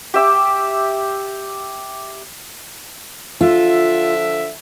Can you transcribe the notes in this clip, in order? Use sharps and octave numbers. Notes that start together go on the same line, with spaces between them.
G4 E5 D6
D3 F3 F4 E5